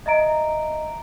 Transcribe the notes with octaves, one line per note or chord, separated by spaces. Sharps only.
D#5 E5 A#5 D7